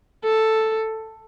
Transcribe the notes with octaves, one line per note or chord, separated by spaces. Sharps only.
A4